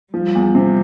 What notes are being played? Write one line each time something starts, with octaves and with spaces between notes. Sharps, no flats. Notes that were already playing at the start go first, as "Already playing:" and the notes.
F3 G3
E2
C3